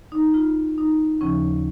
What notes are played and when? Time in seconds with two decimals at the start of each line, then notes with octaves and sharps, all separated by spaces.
0.12 D#4
0.34 F4
0.78 D#4
1.21 D#2 C#3 F3 C#4